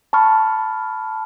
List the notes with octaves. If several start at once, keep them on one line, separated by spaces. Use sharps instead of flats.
A5 B5 C#6 F6